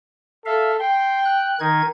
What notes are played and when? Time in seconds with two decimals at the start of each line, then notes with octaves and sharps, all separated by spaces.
0.45 A4 E5 F5
0.80 G5 C6
1.25 F#6
1.60 D#3 D#4 G#6